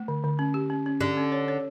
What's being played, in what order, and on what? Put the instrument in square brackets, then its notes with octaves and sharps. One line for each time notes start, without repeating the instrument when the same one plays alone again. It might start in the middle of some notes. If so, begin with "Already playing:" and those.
Already playing: [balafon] A3
D3
D3
C#4
G4
C#4
C#4
[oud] D3 [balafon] G4
[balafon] C#4
C#5
C#5